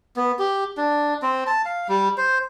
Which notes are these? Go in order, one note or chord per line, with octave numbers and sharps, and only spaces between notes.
B3
G4
D4
C4
A5
F5
G3
C5